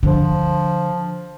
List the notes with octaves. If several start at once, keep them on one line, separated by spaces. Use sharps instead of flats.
D3 F3